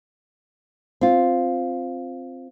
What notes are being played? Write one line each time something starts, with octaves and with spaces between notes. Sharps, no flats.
C4 F4